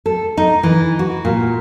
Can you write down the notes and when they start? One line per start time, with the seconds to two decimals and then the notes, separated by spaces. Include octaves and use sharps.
0.06 A4
0.37 D#4
0.63 E3
0.99 F#4
1.25 A#2